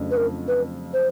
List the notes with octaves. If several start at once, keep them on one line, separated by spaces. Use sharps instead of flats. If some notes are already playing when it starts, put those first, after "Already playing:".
Already playing: F2 C#3 F#3 A3 D4
B4
A#4
B4
C5